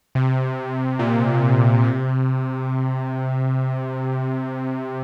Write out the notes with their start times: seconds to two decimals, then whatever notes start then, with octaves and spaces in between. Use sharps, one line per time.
0.15 C3
0.99 A#2
1.84 C3